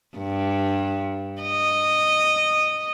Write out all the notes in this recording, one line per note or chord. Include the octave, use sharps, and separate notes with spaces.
G2
D#5